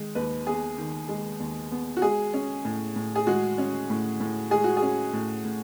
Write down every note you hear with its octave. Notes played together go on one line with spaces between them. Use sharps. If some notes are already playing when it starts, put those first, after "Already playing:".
Already playing: D#3 G#3
D#2 B4
B3 G#4
D#3
G#3
D#2
B3
F#4
G#3 G#4
C#4
A2
A2
G#4
G#3 F#4
C#4
A2
A2
G#3 G#4
F#4
G#4
C#4
A2
A2